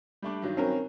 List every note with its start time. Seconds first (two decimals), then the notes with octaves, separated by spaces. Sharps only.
0.22 G3 A3 D4
0.42 G2 D#3 F#3
0.57 C4 C#4 A#4